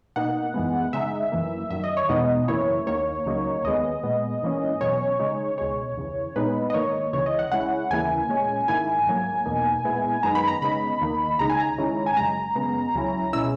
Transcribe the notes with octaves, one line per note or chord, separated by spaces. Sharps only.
B2 A#3 D#4 F#5
F#2 E3 G#3 B3
C#3 G#3 D#4 E5
F#2 E3 A#3
F#2 D#3 F#3 E5
D#5
C#5
E2 B2 G#3 B3 D#4 D#5
F#2 C#3 E3 A#3 E4 C#5
D#2 D#3 A#3 C#5
C#2 C#3 F#3 A#3 D#4
D#2 D#3 G#3 B3 D#5
A#2 G#3 B3
G#2 E3 A#3 C#4
E2 B2 F#3 C#4 C#5
C#3 G#3 D#4
C#2 B2 G#3 C#5
E2 C#3 E3
A#2 G#3 B3 D#4 B4
D#5
G#2 D#3 A#3 D#4 C#5
C#2 C#3 E3 C#5
D#5
F#5
C#3 G#3 C#4 E4 F#5
D#2 C#3 E3 A#3 E4 G#5
A#2 G#3 C#4
G#2 D#3 A#3 E4 G#5
G#2 F#3 A#3
E2 B2 A#3 D#4
A#2 G#3 B3 E4
F#2 D#3 G#3 B3 D#4 A#5
B5
A#5
C#3 G#3 B3 D#4 B5
D#2 D#3 A#3 D#4
C#2 C#3 G#3 D#4 A#5
G#5
A#5
G#2 D#3 G#3 C#4 E4
G#5
F#2 C#3 G#3 A#5
F#2 C#3 G#3 B3
C#2 C#3 F#3 C#4 E4
B2 G#3 C#4 E4 E6